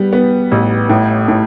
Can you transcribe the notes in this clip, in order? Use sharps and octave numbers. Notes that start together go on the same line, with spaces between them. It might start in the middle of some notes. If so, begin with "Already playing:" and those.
Already playing: G3 B3
B3
A1
A2
A2